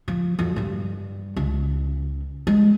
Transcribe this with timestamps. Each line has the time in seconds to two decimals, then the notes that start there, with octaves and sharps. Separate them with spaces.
0.08 F3
0.39 F2 F#3
0.56 G2 G3
1.36 C#2
2.47 G#3